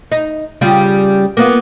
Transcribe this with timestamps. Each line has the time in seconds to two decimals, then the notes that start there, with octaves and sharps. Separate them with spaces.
0.12 D#4
0.61 C#3 G3 F4
1.37 A#3 B3 F4